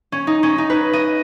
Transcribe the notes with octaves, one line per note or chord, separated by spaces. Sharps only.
C#4
D#4
C#4
D#4
B4
D#5